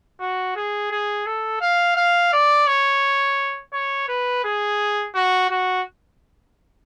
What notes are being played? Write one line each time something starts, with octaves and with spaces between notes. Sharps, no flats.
F#4
G#4
G#4
A4
F5
F5
D5
C#5
C#5
B4
G#4
F#4
F#4